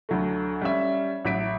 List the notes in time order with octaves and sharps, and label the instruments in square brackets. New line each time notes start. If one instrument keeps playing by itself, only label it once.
[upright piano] D2 F#3 A3
G3 C#4 E5
A1 F#3 E5 B6 D7